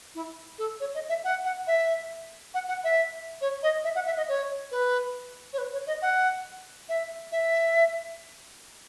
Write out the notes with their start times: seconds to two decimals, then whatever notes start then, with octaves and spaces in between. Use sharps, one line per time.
0.15 E4
0.58 A4
0.80 C#5
0.94 D#5
1.09 E5
1.24 F#5
1.45 F#5
1.67 E5
2.54 F#5
2.68 F#5
2.83 E5
3.41 C#5
3.62 D#5
3.84 E5
3.95 F#5
4.06 E5
4.17 D#5
4.28 C#5
4.71 B4
5.53 C#5
5.58 B4
5.72 C#5
5.86 D#5
6.02 F#5
6.89 E5
7.32 E5